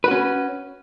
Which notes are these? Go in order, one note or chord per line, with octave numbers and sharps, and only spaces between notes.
C#4 F#4 B4